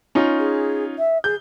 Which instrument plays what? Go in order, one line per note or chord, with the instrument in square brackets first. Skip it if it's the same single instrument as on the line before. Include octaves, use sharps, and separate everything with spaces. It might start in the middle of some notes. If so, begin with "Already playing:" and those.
[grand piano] C#4 D#4 F4
[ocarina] G#4
E5
[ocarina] G#4 [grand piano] G6